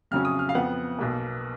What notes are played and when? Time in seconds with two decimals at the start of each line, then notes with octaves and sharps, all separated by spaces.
0.11 F2 C#3 F#3 C#4 F6
0.25 D#6
0.39 F6
0.49 F5
0.55 F2 F3 B3 F#5
0.99 B1 B2 A#3